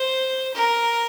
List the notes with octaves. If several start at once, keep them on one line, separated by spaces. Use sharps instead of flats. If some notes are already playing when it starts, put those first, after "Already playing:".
Already playing: C5
A#4